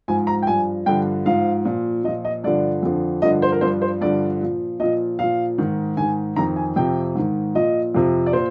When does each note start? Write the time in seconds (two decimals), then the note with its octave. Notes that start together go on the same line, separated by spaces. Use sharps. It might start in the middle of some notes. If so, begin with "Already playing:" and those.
0.08 G#2 F3 G#5
0.27 A#5
0.43 G5
0.47 G2 F3 G#5
0.86 G2 D3 F3 G5
1.26 G#2 F3 F5
1.65 A#2 F3
2.04 A#2 D#5
2.08 F3
2.25 D#5
2.44 G2 D3 F3 D5
2.83 F2 D3 F3
3.22 G2 D3 F3 D#5
3.42 C5
3.52 A#4
3.61 G2 F3 C5
3.82 C5
4.01 G2 D3 F3 D5
4.41 A#2 F3
4.79 A#2 F3 D#5
5.19 A#2 F3 F5
5.58 G#2 D#3
5.97 G#2 D#3 G#5
6.36 F2 D#3 A#5
6.56 G#5
6.76 F2 C3 F3 G5
7.15 G#2 D#3
7.55 A#2 F3 D#5
7.95 F2 C3 F3
8.26 D5
8.33 A#2 C5